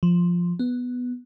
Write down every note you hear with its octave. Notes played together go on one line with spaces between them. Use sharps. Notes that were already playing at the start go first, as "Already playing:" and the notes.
F3
B3